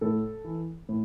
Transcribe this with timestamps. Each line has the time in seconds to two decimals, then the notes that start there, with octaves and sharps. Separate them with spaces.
0.01 A2 A4
0.45 E3
0.89 A2